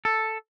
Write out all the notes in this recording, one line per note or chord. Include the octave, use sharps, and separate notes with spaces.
A4